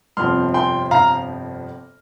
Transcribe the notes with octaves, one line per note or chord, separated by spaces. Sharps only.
G1 F2 C3 F3 C6 F6
G5 C6
F5 A#5